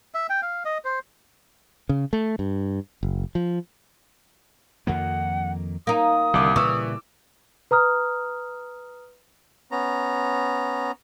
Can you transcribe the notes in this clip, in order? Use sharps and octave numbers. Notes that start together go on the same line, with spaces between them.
E5
G5
F5
D#5
C5
C#3
A3
G2
F#1
F3
F2 D#3 A#3 F#5
A#3 D#4 D#6
C2 D3 D#3 D6
A#2 C#3 E3 G3 C#6 E6
B4 A#5 D#6 F6
B3 C#4 A#5